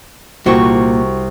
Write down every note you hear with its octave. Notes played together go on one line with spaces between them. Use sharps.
C2 A#2 F#4 C5 G5 C#6